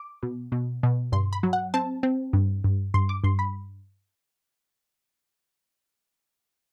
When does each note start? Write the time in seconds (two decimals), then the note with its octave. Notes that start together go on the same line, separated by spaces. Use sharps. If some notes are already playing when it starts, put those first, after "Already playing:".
Already playing: D6
0.23 B2
0.52 B2
0.83 B2
1.12 G2 C6
1.33 B5
1.43 F#3
1.53 F#5
1.74 C4 A5
2.03 C4
2.33 G2
2.64 G2
2.94 G2 C6
3.09 D6
3.24 G2 C6
3.39 B5